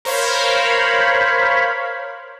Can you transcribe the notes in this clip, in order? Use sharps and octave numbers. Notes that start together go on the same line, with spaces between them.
A#4 C5 C#5 F5 B5